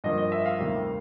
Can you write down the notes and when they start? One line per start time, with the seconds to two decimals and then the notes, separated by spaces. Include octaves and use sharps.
0.04 G2 D3 F3 A#3 D#5
0.18 D#5
0.32 E5
0.46 F5
0.59 D2 C3 D#3 G3 A#3